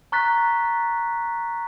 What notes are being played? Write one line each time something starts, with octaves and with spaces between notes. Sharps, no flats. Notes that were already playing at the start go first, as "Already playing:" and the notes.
A#5 C#6 F#6 A6 B6